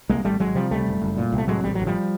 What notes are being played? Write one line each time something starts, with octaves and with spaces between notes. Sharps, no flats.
C2 G#3 A#3
G#1 G3 A3
G#1 F#3 G#3
C3 F3 G3
C#2 G3 A3
F#1
F#1
A#2
C2
A3
A2 F#3 G#3
A1 G3
G1 F#3
F3 G3